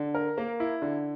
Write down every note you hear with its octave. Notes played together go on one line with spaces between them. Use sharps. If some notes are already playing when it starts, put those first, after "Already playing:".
Already playing: D3
A#4
A#3
E4
D3